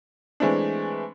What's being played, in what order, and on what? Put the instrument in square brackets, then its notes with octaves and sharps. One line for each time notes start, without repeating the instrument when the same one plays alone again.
[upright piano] E3 G#3 A3 C4 D4